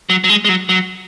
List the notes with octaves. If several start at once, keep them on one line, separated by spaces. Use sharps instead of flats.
F#3
F#3
G#3
G#3
F#3
F#3